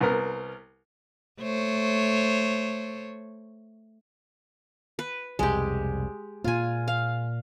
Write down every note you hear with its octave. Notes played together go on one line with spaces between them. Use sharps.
C2 B3 A#4
A3 C5 C#5
B4
C2 F2 B2 G#3 G4
A#2 A#3 F4 G#5
F5